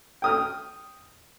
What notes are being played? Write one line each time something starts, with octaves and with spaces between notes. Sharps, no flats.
G5 D#6 F6